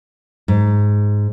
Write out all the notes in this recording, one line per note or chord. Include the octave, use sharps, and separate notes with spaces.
G#2